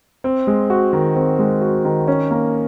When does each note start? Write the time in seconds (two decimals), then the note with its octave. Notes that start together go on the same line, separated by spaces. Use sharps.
0.24 C4
0.47 G#3
0.70 F#4
0.93 D#3
1.16 C4
1.39 G#3
1.61 F#4
1.85 D#3
2.08 C#4
2.31 A#3